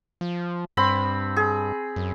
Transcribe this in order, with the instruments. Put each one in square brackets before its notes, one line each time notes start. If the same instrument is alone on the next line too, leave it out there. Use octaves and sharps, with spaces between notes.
[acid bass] F3
[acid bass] G2 [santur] C4 B5
[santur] G#4
[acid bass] F#2